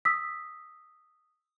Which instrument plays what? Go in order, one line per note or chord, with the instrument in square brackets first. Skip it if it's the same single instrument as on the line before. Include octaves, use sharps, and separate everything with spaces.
[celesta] D#6 E6 B6